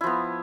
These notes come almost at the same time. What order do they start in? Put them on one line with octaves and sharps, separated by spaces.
E4 F3 B3